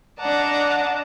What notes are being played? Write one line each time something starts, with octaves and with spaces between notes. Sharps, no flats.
D4 D5 D#5 F#5 A5 A#5